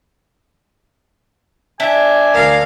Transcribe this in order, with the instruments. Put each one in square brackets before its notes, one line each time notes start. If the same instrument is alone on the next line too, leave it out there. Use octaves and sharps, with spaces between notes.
[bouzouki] D4 [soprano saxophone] E5 [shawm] G#5
[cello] D2 F5 [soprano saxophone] A#4